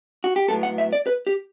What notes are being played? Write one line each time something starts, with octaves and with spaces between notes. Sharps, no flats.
F#4
G4
A2 F#3 B3 A4
F#5
E5
D5
B4
G4